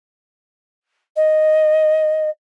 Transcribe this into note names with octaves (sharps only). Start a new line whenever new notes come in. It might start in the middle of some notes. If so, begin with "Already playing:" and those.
D#5